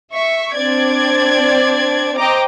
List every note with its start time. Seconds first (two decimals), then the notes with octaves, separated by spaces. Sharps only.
0.12 E5 C#6
0.56 C4 D4 D5 G#6
2.17 C5 D#5 G5 A#5 D6